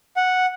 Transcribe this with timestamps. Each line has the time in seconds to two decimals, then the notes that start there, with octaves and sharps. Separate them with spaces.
0.17 F#5